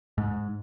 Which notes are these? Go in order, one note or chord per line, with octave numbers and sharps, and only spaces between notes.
G#2